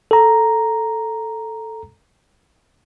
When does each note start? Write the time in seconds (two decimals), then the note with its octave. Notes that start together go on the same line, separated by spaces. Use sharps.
0.11 A4 A#5